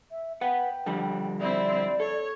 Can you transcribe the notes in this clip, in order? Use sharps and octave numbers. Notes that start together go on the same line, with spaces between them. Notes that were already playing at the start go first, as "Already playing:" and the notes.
E5
B4 F#5 G5
D3 F3 G3
C4 E4 D5
A4 C#5